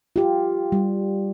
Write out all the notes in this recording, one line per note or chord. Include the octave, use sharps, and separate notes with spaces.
F4 G4
G3